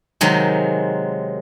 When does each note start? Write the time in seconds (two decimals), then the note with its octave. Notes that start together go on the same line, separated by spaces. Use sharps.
0.21 C3 D#3 F#3 G#3